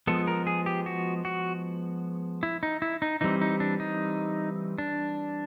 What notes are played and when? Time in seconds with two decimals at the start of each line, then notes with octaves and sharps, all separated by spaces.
0.07 F3 G#3 B3 A4
0.27 A#4
0.47 G#4
0.66 G4
0.86 F#4
1.25 F#4
2.43 E4
2.63 D#4
2.82 E4
3.02 D#4
3.21 E3 G3 C4 D#4
3.41 D#4
3.60 D4
3.80 D#4
4.78 D4